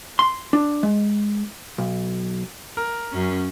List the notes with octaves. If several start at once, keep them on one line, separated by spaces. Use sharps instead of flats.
C6
D4
G#3
B1
A#4
F#2 C#4